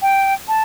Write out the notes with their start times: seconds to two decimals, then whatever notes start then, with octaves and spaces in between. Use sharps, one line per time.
0.02 G5
0.48 A5